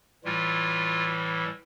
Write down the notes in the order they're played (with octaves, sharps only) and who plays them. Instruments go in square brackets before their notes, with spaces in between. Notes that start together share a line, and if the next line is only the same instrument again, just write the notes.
[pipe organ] A2 E3 G3 F4